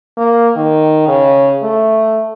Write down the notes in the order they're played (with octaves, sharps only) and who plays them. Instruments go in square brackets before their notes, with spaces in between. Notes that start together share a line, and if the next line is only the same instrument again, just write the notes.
[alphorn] A#3
D#3
C#3
A3